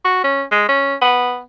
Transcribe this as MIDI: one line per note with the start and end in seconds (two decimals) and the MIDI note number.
0.05 0.24 66
0.24 0.43 61
0.51 0.68 56
0.69 0.95 61
1.02 1.41 59